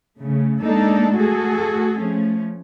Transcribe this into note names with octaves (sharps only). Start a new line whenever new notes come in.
C#3 A3
G#3 A#3 D4 D#4 A4
A3 F#4 G#4 A4
F3 A3 C#4